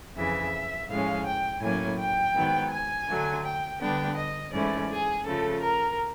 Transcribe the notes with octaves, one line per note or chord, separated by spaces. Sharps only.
F2 C#3 E3 E5
A2 F3 G#3 C#4 F5
G5
A2 F#3 A#3 C#4 G#5
G5
G#2 D#3 F#3 B3
G#5
D3 F#3 A3
G5
D3 G3 B3 D4 G5
D#5
G#2 E3 A3 C#4 E4 D5
G#4
C#3 F3 A3 A4
A#4